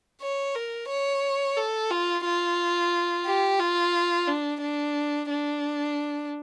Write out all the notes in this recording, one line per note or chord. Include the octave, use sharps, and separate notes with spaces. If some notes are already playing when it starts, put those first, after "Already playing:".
C#5
A#4
C#5
A4
F4
F4
G4
F4
D4
D4
D4